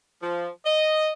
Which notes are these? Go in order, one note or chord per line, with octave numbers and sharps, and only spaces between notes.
F3
D#5